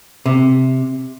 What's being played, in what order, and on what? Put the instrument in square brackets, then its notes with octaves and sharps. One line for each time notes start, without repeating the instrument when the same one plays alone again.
[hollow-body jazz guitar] C3